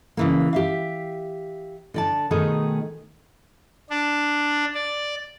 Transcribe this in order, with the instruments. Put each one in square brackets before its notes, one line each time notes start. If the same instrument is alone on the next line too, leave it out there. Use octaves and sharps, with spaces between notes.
[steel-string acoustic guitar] C#3 E3 A#3
G4 E5 F5
D3 D5 A5
B2 D#3 A3 D#4 G#4
[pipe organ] D4
D5